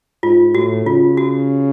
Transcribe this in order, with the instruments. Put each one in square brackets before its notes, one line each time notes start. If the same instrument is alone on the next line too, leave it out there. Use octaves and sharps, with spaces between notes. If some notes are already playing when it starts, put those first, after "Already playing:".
[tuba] G#2 [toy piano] F4
[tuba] A2 [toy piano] F#4
[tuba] C#3 [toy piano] F4
[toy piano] F#4